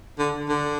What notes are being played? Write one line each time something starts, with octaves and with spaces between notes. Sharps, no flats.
D3
D3